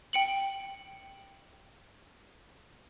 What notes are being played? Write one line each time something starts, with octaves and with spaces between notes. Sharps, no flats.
G5 C#7 F#7